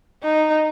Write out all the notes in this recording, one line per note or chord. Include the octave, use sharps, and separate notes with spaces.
D#4